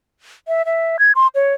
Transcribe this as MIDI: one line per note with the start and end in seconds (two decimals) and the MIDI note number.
0.48 0.65 76
0.66 0.97 76
0.99 1.12 92
1.15 1.27 84
1.35 1.54 73